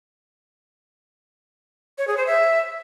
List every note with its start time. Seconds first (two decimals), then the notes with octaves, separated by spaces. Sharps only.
1.98 C#5
2.08 G#4
2.17 C5
2.27 E5